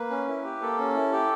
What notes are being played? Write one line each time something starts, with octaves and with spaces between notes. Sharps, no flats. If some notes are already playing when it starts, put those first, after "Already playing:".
Already playing: A#3 B4
C#4
E4
G4
A#3 A4
C#4
E4
G4